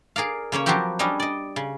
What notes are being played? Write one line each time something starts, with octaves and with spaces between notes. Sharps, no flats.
G#4 A#4 D5 F5
C#3 A#3 C#4 C#5
F3 F#3 B3 C4 F#4 G4
G3 C#4 D4 D#5
D5 D#5
C#3